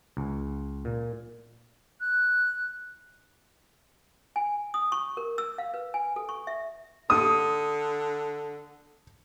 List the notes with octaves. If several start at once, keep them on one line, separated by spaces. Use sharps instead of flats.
C#2
A#2
F#6
G#5
D#6
C#6
A#4
E6
F5
B4
G#5
A4
C#6
E5
D3 D#6